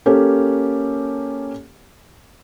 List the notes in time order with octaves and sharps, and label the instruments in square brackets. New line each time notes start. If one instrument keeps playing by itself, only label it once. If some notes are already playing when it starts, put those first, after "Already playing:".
[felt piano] A#3 C#4 G4 A4